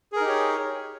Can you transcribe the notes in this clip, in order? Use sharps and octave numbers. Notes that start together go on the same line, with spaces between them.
D#4 G4 G#4 A#4 C#5